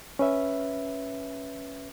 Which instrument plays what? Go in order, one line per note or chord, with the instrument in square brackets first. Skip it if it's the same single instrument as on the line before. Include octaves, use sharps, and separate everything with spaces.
[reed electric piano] C#4 B4 E5